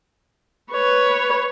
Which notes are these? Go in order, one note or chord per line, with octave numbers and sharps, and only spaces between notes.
B4 C#5